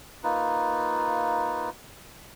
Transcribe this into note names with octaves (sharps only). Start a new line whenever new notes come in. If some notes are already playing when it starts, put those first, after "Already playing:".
A#3 D#4 F4 B4